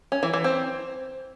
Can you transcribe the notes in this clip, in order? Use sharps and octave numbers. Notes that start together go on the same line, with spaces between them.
C#4
E3
E3
C4